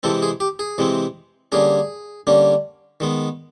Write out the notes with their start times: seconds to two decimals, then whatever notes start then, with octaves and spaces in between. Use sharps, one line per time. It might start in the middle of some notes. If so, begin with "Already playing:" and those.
0.03 C3 E3 G#3 C4 A4
0.22 G#4
0.40 G4
0.59 G#4
0.78 C3 E3 G#3 C4
1.52 D3 G3 A#3 C#4 G#4
2.27 D3 G3 A#3 C#4
3.00 D#3 G#3 B3